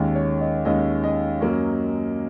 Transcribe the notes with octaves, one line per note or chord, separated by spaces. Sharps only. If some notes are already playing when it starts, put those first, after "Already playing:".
Already playing: D#2 D#3 G#3 C#4 D#5
C#5
D#5
D#2 D#3 G#3 C#4 D#5
D#5
F#2 F#3 A#3 C#4